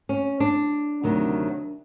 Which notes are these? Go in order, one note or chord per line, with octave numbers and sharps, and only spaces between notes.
C#4
D4
D2 C3 D#3 F#3